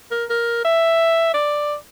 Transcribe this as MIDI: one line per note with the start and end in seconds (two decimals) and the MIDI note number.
0.11 0.25 70
0.30 0.65 70
0.65 1.33 76
1.34 1.76 74